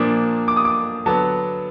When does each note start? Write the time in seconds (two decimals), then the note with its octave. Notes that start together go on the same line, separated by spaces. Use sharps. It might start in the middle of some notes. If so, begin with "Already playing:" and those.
Already playing: A#2 F3 A#3 D4 D#6
0.48 D6
0.56 D#6
0.65 D6
1.06 D3 F#3 B3 A5